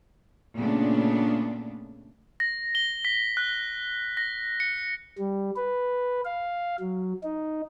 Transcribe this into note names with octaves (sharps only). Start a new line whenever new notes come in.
A#2 C#3 A3 B3 D4
A#6
G7
B6
F#6
A#6
C#7
G3
B4
F5
F#3
D#4